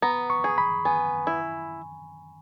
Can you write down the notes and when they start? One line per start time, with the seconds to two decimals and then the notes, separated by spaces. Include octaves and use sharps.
0.02 B3 A#5
0.30 C#6
0.44 G#4
0.58 B5
0.85 B3 G#5
1.27 E4